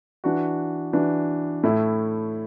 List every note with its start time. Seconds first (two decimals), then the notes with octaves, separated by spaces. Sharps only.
0.24 E3 D4 F#4
0.93 E3 D4 F#4
1.63 A2 A3 E4